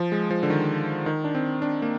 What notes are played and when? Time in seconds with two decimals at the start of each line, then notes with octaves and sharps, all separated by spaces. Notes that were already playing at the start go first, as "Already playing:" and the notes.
Already playing: F3
0.12 G#3
0.30 F3
0.43 D3
0.50 D#3
1.06 D#3
1.24 D4
1.35 C4
1.62 D4
1.82 A#3